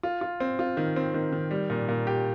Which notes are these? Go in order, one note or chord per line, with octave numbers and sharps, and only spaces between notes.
F4
F4
C4
F4
D#3
C4
D#3
D#3
G3
A#2
A#2
G4